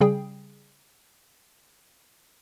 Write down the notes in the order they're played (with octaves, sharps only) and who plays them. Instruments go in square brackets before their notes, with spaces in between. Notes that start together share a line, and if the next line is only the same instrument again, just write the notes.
[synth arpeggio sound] C#3 G3 G#4 G5